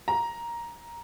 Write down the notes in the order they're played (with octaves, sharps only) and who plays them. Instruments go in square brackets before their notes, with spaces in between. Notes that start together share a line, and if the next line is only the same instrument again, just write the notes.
[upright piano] A#5